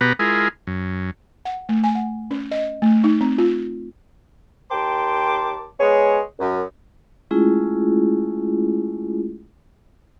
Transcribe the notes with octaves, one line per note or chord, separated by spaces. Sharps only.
B2 B3 G4 B4 A#5
G#3 E4 F4 G#4 A#4
F#2
F#5
A3
G#5
F#5
C#4
D#5
A3
D#4
C4
F4
D#2 A#4 G5 A5 C6 D6
G#3 B3 G#4 C#5
F#2
G#3 A3 C#4 E4 F4 G#4